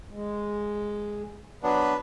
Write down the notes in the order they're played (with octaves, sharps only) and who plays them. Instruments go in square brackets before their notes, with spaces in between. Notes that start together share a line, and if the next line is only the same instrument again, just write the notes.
[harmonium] G#3
[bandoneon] F#3 B3 D4 [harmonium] B4